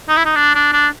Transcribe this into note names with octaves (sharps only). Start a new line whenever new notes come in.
D#4
E4
D#4
D4
D4
D4